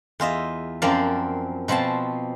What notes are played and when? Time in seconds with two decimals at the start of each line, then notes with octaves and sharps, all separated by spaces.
0.20 E2 F4 D#5 E5
0.82 F#2 F3 C4 A#4 D5 F5
1.68 B2 F3 C4 G#5 A5